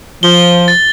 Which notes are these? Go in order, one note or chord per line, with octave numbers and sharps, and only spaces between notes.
F3 G7
A6